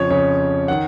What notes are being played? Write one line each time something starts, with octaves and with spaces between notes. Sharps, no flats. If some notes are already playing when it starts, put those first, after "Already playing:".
Already playing: F2 C#3 F3 C#5
F2 C#3 F3 C#5
D#3 F#5